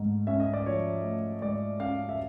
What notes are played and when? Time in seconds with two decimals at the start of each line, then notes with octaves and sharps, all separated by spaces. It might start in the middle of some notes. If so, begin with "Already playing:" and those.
Already playing: G#2 A3
0.27 C#4 E5
0.40 D#5
0.53 D5
0.66 F3 C#5
1.03 A3
1.42 G#2 D5
1.80 C#4 F5
2.09 E5